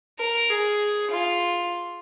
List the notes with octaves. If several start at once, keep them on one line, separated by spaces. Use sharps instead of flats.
A#4
G#4
F4